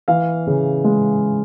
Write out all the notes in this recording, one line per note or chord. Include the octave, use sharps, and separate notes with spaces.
E3 F5
C#3
G#3